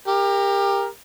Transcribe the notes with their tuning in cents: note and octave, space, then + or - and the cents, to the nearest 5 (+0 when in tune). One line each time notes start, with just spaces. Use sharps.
G4 +25 A#4 +0